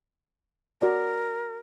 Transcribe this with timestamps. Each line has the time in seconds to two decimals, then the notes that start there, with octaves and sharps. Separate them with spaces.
0.81 F#4 A#4 D5 A5